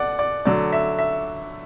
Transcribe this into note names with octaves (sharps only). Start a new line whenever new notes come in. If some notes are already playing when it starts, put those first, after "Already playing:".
Already playing: B2 A3 D5 F#5
D5
D3 F#3 A3 D5
E5
E5